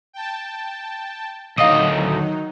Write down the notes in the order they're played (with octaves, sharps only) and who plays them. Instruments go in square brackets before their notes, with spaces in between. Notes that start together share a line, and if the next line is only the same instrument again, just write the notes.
[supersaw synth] G5 A5
[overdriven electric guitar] D2 D#5 [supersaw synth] D#3 F#3 D#4 [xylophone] F5 D#6